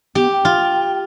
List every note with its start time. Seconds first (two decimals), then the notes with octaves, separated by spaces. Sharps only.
0.15 B3 G4
0.31 G5
0.45 F4